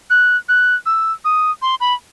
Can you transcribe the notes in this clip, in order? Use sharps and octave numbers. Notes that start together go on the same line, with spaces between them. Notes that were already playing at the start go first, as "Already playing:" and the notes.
F#6
F#6
E6
D#6
C6
B5